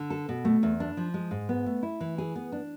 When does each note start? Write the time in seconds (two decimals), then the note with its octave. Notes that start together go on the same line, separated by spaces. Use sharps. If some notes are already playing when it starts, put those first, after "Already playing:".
Already playing: D3
0.10 A4
0.29 B2
0.45 A3
0.63 E2
0.80 D4
0.97 F3
1.14 G#3
1.31 G#2
1.49 B3
1.66 A3
1.83 E4
2.00 E3
2.18 G#4
2.35 B3
2.52 D4